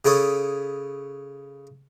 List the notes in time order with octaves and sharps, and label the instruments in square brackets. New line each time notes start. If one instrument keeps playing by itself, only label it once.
[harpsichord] C#3 E4 A4 C#5 D#6